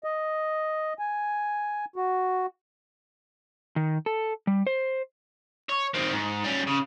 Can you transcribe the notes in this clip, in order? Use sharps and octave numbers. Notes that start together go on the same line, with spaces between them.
D#5
G#5
F#4
D#3
A4
G3
C5
C#5
D#3 C4
G#2
G3 C#4
C#3